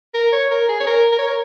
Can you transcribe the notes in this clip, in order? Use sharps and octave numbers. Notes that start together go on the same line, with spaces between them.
A#4
C#5
A#4
G#4
C#5
A#4
A#4
C#5
A#4